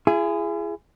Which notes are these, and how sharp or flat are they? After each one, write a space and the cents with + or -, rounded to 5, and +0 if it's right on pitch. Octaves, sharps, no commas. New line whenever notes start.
E4 +45 G#4 +0